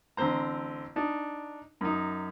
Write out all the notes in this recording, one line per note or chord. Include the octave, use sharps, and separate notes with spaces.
A1 D3 C4 C5 A#5
D4 D#4
F#2 D#4